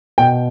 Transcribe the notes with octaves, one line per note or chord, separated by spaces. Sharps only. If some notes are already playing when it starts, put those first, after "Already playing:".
B2 G5